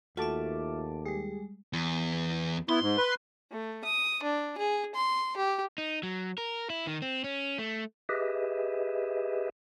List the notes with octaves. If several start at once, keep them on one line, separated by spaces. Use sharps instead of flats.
D#2 A3 F4 F#4 E5 A5 D6
G3 G#3 G4 G#4
E2
B3 E4 C6
G#2
B4
A3
D#6
D4
G#4
C6
G4
D#4
F#3
A#4
E4
D#3
C4
C#4
A3
G4 G#4 B4 D#5 E5